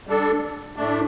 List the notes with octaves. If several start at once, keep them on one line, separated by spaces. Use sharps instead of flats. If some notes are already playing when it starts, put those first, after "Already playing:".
G3 D4 A4
A2 A3 D4